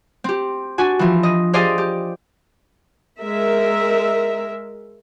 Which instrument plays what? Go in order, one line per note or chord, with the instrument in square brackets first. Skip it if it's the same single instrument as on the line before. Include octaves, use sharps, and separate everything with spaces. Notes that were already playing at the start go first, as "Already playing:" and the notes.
[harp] C4 G4
D4 F#4 G#5
E3 F3
D#5
G4 G#4 C5 D5 D#5 F5
G4
[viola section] G#3 A#4 E5